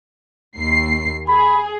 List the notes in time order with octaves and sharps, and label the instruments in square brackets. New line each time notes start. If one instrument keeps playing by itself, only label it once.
[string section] D#2 C7
[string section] G#4 [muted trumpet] B5